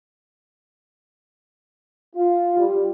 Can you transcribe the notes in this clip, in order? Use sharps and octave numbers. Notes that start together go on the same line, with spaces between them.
F4
G3